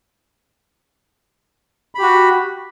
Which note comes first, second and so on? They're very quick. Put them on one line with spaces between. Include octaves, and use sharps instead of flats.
B5 G4 F#4